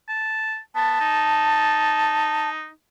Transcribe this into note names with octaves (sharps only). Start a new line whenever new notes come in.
A5
B3 A5
D#4